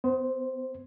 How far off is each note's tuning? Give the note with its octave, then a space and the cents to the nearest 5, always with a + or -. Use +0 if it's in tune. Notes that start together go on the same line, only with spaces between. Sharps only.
B3 +40 C5 +0